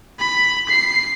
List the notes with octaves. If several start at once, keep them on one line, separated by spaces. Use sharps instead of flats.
B5
C7